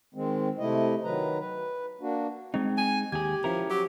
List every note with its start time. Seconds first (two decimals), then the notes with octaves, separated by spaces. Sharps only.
0.14 D#3 G#3 C4
0.59 C3 A3 E4 D#5
1.04 D#3 F#3 B4 A#5
1.39 B4
2.01 A#3 D4 F#4
2.54 G#3 C4 D#4
2.78 G#5
3.12 D#2 G4 G#4 G#6
3.44 F3 C#4 E4 A#4
3.70 F#3 G4